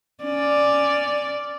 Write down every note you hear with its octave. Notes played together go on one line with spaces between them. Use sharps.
C#4 D5